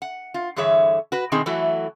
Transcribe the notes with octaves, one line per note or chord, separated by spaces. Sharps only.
F#5
F4
G2 D3 E3 G#4 C#5 E5
F#4 B4
B2 D#3 C4 D#4 G#4
E3 F#3 A3 E4 F#4